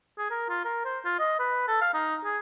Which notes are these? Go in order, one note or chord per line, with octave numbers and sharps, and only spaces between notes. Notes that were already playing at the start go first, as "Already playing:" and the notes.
G#4
A#4
F4
A#4
C5
F4
D#5
B4
A4
F5
D#4
G#4